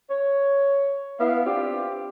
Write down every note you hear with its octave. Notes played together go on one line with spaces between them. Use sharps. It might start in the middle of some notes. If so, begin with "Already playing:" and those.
C#5
B3 E4 F5
C4 D4 F4 G4